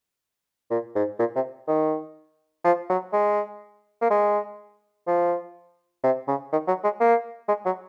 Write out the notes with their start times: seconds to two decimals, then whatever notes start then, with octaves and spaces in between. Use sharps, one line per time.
0.71 A#2
0.96 G#2
1.19 A#2
1.36 C3
1.68 D#3
2.65 F3
2.90 F#3
3.13 G#3
4.01 A#3
4.10 G#3
5.07 F3
6.04 C3
6.28 C#3
6.52 D#3
6.68 F#3
6.84 G#3
7.00 A#3
7.48 G#3
7.66 F#3